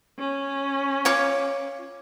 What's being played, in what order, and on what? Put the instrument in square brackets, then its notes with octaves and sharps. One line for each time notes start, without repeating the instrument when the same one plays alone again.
[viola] C#4
[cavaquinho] F4 C#5 D6